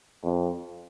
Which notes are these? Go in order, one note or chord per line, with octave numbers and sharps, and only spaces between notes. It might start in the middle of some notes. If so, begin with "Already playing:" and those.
F2